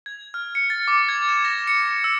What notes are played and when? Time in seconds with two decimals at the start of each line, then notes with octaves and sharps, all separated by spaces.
0.06 G#6
0.34 F6
0.55 C#7
0.70 A6
0.88 D6
1.09 G#6
1.29 E7
1.45 A#6
1.67 C#7
2.04 E6